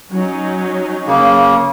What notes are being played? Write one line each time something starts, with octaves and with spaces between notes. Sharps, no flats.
F#3 C#4 D#4
C#3 A#3